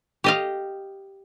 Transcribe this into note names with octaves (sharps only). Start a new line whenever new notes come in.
G4 D#5 F5